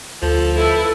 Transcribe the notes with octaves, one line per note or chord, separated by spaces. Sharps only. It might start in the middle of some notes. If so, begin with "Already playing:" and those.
D2 F3 A4
E4 A4 B4